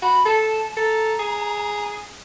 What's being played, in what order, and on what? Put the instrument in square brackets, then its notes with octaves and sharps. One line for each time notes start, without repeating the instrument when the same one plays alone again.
[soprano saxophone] F#4 [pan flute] B5
[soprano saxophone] A4 [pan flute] A5
[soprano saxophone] A4 [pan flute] A#5
[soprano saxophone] G#4